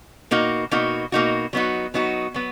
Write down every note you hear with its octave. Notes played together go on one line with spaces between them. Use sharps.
B2 A#3 D#4 F#4
B2 A#3 D#4 F#4
B2 A#3 D#4 F#4
F#3 B3 D#4 F#4
F#3 B3 D#4 F#4
F#3 B3